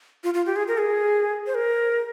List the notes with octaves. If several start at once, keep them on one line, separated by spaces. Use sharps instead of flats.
F4
F4
G4
G#4
A#4
G#4
C5
A#4